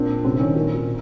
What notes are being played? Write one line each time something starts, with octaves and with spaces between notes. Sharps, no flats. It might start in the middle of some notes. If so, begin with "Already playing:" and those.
Already playing: A#2 C4 D4
C3 C4
D#3 C#4
A#2
B2